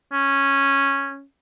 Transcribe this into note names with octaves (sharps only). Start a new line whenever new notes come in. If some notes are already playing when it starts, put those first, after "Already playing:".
C#4